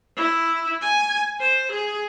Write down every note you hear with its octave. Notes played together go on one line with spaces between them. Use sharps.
E4
G#5
C5
G#4